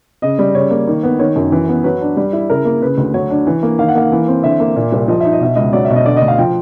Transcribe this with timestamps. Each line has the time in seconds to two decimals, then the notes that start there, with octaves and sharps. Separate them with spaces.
0.22 C#3 D#5
0.39 G3
0.55 C#3 C#5
0.71 A#3
0.87 D#3
1.03 B3
1.19 D#3 C#5
1.36 F#2
1.52 E3
1.68 B3
1.84 F#3 B4
2.01 D4
2.17 G3
2.33 E4
2.50 C#3 A#4
2.65 A#3
2.82 C#3 B4
2.97 D2
3.14 F#3 C#5
3.30 D4
3.47 E3
3.63 A#3
3.79 D#3 F5
3.89 F#5
3.95 A#3 F5
4.12 E3
4.28 C4
4.43 D3 E5
4.60 A#3
4.76 A#2
4.92 C2
5.08 F3 D#5
5.20 D#4 E5
5.32 D#5
5.41 B2 E5
5.55 C#2 D#5
5.73 F#3 D5
5.85 E5
5.90 B2
5.96 D#5
6.05 D3 D5
6.16 D#5
6.21 D2
6.28 F5
6.38 F3 G5